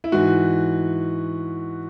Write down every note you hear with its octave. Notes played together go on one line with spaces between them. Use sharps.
E4
G#2 E3 F#4